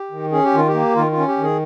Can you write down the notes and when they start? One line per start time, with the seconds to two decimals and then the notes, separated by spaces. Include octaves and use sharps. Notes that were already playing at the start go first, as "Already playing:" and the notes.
Already playing: G4
0.11 D#3
0.32 C#4 G#4
0.44 G4
0.54 D#3 F4
0.68 G4
0.74 A#3
0.95 D#3 F4
1.11 F4
1.17 C#4
1.28 G4
1.38 D#3
1.43 G#4